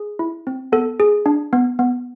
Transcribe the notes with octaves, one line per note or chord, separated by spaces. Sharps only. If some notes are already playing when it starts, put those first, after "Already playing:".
Already playing: G#4
E4
C4
B3 A4
G#4
D4
B3
B3